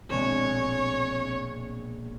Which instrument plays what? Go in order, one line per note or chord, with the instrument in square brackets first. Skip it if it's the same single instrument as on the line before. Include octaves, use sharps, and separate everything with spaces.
[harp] A#1 B2 G#3 [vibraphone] C4 [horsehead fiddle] C#5